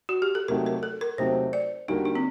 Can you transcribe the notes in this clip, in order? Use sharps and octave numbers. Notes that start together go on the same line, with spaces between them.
F#4
G4
A4
C3 F#3 A3 D#4 G4 A#4
A#4
A4
A#4
C3 F#3 A3 D#4 G4 C5
D5
D3 G3 A#3 D#4 F#4
D#4
C4